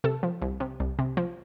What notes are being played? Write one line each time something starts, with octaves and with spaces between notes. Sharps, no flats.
C3 A4
F3
C2
C3
C2
C3
F3